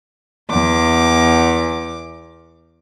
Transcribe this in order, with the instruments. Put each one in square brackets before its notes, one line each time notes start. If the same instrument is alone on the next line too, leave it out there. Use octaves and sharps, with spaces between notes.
[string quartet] E2 D6